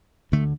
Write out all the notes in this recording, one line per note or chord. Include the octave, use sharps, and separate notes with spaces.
D2 D3 A3